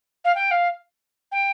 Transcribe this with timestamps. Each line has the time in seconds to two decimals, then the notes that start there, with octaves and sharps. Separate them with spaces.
0.24 F5
0.35 G5
0.51 F5
1.31 G5